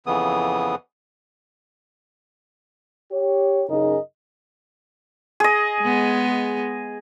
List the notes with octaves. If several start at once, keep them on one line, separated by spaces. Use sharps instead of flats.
F2 C#3 E3 B3 D#6
G4 C#5
F#2 C#3 D#4 G#4 A#4 D#5
G#4 D#5
G#3 B3